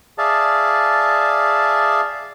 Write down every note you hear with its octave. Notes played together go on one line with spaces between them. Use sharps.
G#4 D5 E5 F5 A5